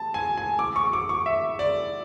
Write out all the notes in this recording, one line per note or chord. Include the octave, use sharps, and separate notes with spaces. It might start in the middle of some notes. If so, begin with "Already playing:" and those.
Already playing: A5
G#5
G#5
D6
C#6
D6
C#6
E5
D5